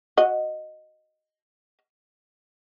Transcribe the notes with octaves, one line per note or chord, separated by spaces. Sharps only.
F#4 D#5